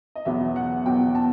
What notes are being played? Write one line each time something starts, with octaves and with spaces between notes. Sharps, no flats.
D#5
E2 B2 F#3 B3 E5
F#5
E2 B2 F#3 B3 G5
A5